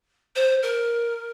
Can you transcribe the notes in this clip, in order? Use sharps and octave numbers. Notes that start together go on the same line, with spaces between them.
C5
A#4